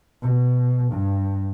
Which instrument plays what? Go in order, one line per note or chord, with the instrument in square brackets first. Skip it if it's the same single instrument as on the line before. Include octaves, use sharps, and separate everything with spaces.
[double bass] B2
G2